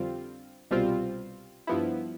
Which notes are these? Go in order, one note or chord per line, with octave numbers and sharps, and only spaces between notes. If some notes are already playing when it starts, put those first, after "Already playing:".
Already playing: F2 D3 G3 C4 F4
C2 B2 G3 C4 F4
G2 F3 B3 E4